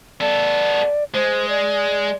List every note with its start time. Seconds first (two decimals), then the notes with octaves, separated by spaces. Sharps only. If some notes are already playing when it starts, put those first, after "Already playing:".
0.21 B3 A4 D5
1.14 G#3 C5
1.49 D5